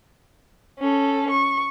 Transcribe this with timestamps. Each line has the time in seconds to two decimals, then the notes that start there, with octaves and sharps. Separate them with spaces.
0.79 C#4 A4
1.30 C#6